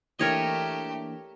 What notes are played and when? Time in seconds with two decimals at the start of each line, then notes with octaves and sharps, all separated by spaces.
0.19 E3 A3 A#3 D4 G4 A#4 C#5 D#5